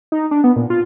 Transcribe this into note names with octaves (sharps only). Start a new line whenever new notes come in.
D#4
D4
B3
A#2
F4